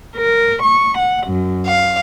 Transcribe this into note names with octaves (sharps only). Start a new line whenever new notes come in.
A#4
C#6
F#5
F#2
F5